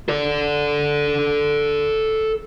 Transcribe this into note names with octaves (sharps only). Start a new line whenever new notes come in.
A4 D5